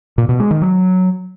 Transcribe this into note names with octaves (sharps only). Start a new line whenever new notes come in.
A#2
B2
G#3
D#3
F#3